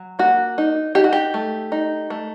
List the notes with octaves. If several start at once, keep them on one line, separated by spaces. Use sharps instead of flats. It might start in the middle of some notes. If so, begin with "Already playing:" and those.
Already playing: F#3
A#3 F#4
D#4
D#4 G4
F#4
G4
A3
D#4
A3